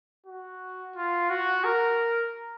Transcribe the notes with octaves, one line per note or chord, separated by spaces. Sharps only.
F#4
F4
F#4
A#4